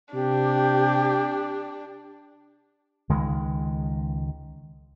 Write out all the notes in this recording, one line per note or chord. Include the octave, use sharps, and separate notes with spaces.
C3 D4 G4
C#2 D#3 G#3